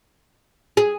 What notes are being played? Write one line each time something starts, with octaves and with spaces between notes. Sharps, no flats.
G#4